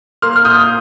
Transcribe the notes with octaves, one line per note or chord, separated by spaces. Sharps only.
A#3 C6 F6
F6
A#2 D#6 G6